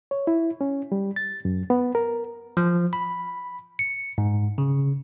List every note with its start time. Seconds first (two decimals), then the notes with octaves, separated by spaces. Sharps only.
0.11 C#5
0.27 E4
0.61 C#4
0.92 G3
1.16 A6
1.45 F#2
1.70 B3
1.95 A#4
2.57 F3
2.93 B5
3.79 C#7
4.18 G#2
4.58 C#3